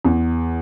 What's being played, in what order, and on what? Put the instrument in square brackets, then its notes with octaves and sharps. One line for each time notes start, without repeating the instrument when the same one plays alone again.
[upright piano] E2